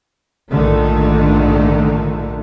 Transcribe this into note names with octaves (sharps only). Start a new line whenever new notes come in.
A#1 G#2 D3 D#3 A3